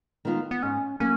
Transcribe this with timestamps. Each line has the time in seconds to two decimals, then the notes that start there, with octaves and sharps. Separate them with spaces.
0.25 D#3 G#3 B3 F4
0.51 B3
0.63 G#2 C#4
1.00 F#3 A#3 C#4